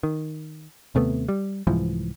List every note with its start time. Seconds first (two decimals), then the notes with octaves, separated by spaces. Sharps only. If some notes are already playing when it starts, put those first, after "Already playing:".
0.03 D#3
0.95 D#2 C3 A3 B3
1.29 G3
1.67 C2 G#2 E3 F3